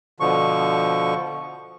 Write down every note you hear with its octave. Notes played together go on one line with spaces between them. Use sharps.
B2 D3 F3 C#6